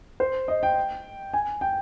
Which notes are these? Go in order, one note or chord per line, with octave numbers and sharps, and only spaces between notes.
C5
D#5
G5
G#5
G5